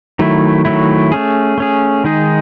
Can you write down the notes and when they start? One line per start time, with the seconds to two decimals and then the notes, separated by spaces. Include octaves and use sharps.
0.19 D#3 F#3 A3 E4
0.65 D#3 F#3 A3 E4
1.12 A3 C#4 G#4
1.58 A3 C#4 G#4
2.04 D#3 G#3 D#4 G#4